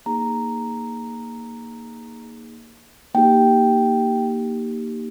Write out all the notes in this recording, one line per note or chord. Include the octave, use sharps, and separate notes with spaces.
A#3 D#4 G#4 A#5
A#3 D#4 G4 G5